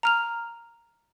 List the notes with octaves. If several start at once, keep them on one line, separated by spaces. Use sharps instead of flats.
A#5 F6 F7